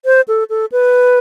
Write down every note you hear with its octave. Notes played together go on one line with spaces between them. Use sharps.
C5
A4
A4
B4